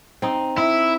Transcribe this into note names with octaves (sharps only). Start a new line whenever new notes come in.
C4 D#4
E4 E5